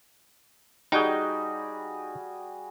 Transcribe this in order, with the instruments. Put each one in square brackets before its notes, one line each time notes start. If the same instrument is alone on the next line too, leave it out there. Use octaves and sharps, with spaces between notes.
[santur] G3 F#4 G#4 [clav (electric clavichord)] D#4 G5